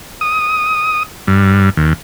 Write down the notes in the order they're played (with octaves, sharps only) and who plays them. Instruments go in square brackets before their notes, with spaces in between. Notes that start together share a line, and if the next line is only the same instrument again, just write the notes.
[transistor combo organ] D#6
G2
D#2